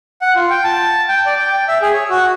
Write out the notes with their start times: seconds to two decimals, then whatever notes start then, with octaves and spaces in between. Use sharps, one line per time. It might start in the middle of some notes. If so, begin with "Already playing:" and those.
0.22 F#5
0.35 F4
0.50 G5
0.64 A5
1.08 G5
1.26 D5
1.39 G5
1.68 E5
1.82 G#4
1.93 C#5
2.10 F#4